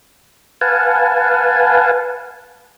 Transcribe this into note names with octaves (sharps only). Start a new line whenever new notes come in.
B4 F5 F#5 G#5 A5